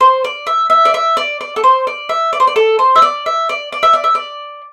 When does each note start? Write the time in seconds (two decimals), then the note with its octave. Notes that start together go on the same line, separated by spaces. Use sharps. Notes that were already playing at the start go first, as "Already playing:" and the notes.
0.01 C5
0.24 D5
0.47 E5
0.70 E5
0.85 D5
0.94 E5
1.17 D5
1.41 D5
1.56 A4
1.64 C5
1.87 D5
2.09 E5
2.33 D5
2.40 C5
2.47 D5
2.56 A4
2.79 C5
2.96 E5
3.02 D5
3.26 E5
3.49 D5
3.72 D5
3.83 E5
3.93 D5
4.04 E5
4.15 D5